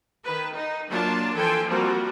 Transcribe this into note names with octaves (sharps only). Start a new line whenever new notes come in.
D#3 B4
D#4
F#3 A#3 D4 F4 A5 C6
E3 F3 A4 G5 G#5 C6
F3 G3 A#3 C4 F4 F#4